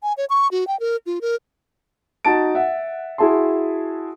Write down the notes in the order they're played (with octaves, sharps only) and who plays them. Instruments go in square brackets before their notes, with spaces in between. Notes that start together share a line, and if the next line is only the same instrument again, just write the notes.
[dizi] G#5
C#5
C#6
F#4
G5
A#4
F4
A#4
[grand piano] D#4 F#4 A5 A6 D7
E5 F#5
E4 F#4 G#4 E5 A5 C6